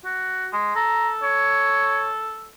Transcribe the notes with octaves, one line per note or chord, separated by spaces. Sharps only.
F#4
G#3
A4 A#5
C#5